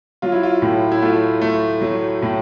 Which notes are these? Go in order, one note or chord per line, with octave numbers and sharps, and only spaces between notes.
F#3 F4
E4
F4
A2
E4
A3 F4
A3
F#3
A2